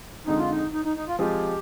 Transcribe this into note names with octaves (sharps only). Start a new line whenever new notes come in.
F2 D3 G#3 D#4
F4
D#4
D#4
D#4
D#4
F4
F3 G#3 C4 F4 G4 G#4